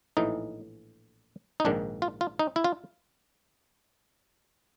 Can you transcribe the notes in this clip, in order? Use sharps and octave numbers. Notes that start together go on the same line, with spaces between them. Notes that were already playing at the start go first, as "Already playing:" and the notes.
A#1 A2 E3 D#4
D#4
A#1 G#2 D#3 D4
F4
F4
D#4
E4
F4